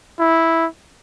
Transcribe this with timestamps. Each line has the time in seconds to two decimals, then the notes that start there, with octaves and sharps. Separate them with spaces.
0.19 E4